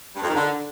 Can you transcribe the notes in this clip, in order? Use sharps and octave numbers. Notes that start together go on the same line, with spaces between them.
G2
F2
D#3
D3